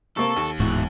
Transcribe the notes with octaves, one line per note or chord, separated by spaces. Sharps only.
C3 A#3 A4 C#6
D#2
D1 E2 G#2 E4 F#4